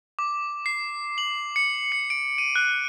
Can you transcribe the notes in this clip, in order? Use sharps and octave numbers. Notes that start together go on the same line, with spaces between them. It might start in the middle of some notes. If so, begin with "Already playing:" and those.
D6
C7
F#7
C#7
C#7
D7
D#7
F#6